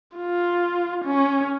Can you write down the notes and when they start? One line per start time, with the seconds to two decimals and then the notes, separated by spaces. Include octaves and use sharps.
0.16 F4
1.05 C#4